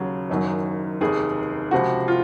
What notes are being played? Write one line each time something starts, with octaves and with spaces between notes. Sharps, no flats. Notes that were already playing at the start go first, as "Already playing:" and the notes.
Already playing: D#2 C#3 F#3
F#1 F#2 D#3 F#3
F1 D#2 D#3 G#4
C#2 C3 F3 F#4
F4